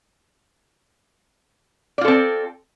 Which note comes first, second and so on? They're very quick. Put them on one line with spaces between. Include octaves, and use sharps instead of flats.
D5 F4 A4 C4